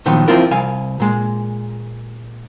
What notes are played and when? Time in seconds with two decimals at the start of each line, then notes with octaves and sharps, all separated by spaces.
0.06 A#2 D#3 F3 F#3 B3
0.28 E3 F3 C4 E4 F4 A#4
0.51 C2 F5 G#5
1.00 A#2 G#3